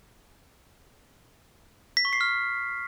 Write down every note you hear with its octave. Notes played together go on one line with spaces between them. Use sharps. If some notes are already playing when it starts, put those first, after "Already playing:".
B6
C#6
C7
F6